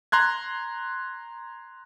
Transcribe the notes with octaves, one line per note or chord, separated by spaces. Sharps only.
A#5 C6 F#6 G#6